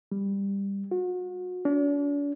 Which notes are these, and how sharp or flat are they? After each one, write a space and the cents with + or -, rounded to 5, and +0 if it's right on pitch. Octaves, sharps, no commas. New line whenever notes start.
G3 +15
F#4 -35
D4 -45